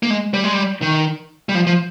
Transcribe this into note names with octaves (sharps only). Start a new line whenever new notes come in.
A#3
G#3
G3
G#3
G3
D#3
G3
F3
F3